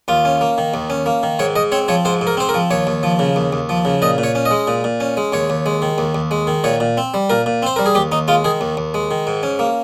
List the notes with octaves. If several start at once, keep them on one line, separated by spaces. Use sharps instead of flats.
D#2 F4
C#4
A#3
D#3
D#2
C#4
A#3
D#3
G#2 C#5
G#2 D#5
C4 C#5
F3 C#5
G#2 C5
G#2
A#4
C4 C5
A#4
F3
D#2 C#5
D#2
F3
C#3
D#2
D#2
F3
C#3
A#2 D#5
A#2
C#5
C#4
D#5
G#3
A#2
A#2
C#4
G#3
D#2 C#5
D#2
G#3
D#3
D#2
D#2
G#3
D#3
A#2 C#5
A#2
C4
G3
A#2 A#4
A#2
C4 C5
G3 A#4
G#4
D#2 G4
D#2 D#4
G#3 F4
D#3 G#4
D#2
D#2
G#3
D#3
G#2
C#4
A#3